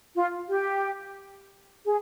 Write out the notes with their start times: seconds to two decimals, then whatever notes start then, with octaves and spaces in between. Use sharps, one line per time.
0.15 F4
0.49 G4
1.85 G#4